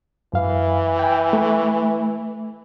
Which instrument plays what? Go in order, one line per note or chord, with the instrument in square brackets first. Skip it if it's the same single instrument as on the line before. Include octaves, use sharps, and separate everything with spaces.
[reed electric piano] F#2 F5 [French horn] E3
[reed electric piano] G5 G#5
A3